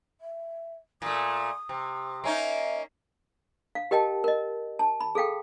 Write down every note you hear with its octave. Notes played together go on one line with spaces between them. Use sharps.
E5
A#2 A3 D#6
C3
A#3 C#4 D#4 E5
F5
G4 A#4 D#5 G5 A5
A#4 D#5
A5
B5
G#4 A4 F5 G5